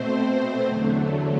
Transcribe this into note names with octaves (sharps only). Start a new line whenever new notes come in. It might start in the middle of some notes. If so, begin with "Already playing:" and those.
Already playing: B2 A3 C4 C5
E2 D3 F#3 A3